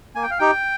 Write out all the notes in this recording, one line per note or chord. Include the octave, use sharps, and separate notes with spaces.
A#3 G#5
G5
F5
D#4 G4 G5